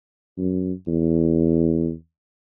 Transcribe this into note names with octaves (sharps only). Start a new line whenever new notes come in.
F#2
E2